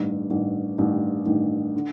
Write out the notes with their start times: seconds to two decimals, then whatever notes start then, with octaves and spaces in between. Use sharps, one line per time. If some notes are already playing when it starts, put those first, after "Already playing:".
Already playing: A1 G2 D#3
0.30 A1 G2 D#3
0.78 A1 G2 D#3
1.26 A1 G2 D#3
1.76 D3